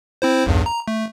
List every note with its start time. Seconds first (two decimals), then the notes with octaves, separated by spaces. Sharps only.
0.22 C4 E4 C5
0.46 B1 E2 G2
0.66 A#5
0.88 A3